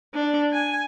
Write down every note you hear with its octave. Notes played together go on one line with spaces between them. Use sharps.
D4
G#5